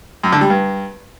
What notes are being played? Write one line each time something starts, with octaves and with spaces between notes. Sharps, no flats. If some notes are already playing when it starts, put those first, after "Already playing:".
F#2
D3
G3
G2